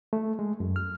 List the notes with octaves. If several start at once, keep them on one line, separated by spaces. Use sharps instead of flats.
A3
G#3
F#2
F6